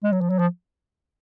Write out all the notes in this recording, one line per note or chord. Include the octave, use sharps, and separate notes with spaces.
G#3
F#3
F3
F#3
F3